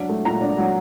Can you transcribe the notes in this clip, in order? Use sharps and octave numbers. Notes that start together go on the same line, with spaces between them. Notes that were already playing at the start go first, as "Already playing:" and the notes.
Already playing: F#3 D4
A3
A#2 A#5
D4
F#3